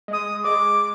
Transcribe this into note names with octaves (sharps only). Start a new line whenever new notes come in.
G#3 D#6
G#3 D6